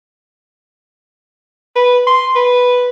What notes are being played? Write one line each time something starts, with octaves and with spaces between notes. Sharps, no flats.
B4
C6
B4